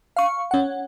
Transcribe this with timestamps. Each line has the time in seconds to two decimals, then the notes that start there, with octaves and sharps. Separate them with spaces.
0.16 F5 C#6
0.51 C#4 F#5